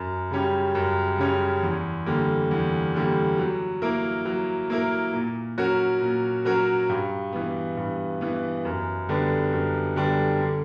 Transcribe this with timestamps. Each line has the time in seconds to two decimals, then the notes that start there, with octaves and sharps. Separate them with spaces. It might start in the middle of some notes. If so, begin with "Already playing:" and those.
Already playing: F#2
0.31 C#3 G3 C#4 G4
0.75 F#2
1.18 C#3 G3 C#4 G4
1.63 E2
2.06 D3 G3 A#3
2.51 E2
2.94 D3 G3 A#3
3.38 F#3
3.82 A#3 E4 A#4
4.25 F#3
4.70 A#3 E4 A#4
5.13 A#2
5.58 F#3 C#4 F#4 A#4
6.01 A#2
6.45 F#3 C#4 F#4 A#4
6.89 G2
7.33 E3 B3
7.77 G2
8.21 E3 B3
8.65 F#2
9.09 D3 G3 B3 D4
9.53 F#2
9.96 D3 G3 B3 D4
10.40 D3